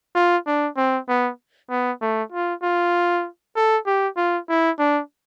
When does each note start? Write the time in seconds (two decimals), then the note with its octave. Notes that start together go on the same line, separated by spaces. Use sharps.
0.15 F4
0.47 D4
0.77 C4
1.09 B3
1.70 B3
2.01 A3
2.32 F4
2.63 F4
3.56 A4
3.86 G4
4.17 F4
4.49 E4
4.79 D4